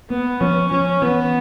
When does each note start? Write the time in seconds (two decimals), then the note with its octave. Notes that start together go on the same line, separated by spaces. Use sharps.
0.10 A#3 B3
0.40 F3 C#4
0.71 F3 C#4
1.01 E3 B3